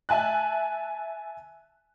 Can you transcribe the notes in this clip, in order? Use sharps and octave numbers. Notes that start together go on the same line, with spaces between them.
E5 G#5 A5 F#6